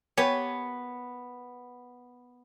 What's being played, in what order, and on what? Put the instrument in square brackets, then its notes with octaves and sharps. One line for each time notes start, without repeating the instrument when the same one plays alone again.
[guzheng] B3 [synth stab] G4 C#5 G#5